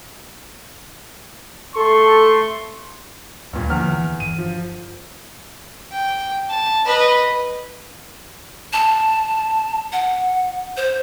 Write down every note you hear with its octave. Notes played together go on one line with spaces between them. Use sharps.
A3 A4 C6 C#6
D2 G2 A#2
E2 D3 F3 F#3 F6
E3
G1 D#7
F3
G5
A5
B4 D#5
A5
F#5
C5